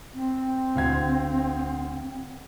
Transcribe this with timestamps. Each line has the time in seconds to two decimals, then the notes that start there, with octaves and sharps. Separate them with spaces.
0.14 C4
0.75 D2 F5 G#6